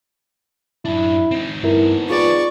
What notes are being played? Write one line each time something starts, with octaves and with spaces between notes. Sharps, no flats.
F#2 D4 E4
C4 D#4
G2 B3 E4 A#4
F4 G#4 B4 D5 C#6